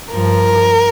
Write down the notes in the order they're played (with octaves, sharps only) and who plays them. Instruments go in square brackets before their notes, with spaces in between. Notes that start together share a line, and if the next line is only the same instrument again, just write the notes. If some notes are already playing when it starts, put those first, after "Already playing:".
[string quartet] G2 F3 A#4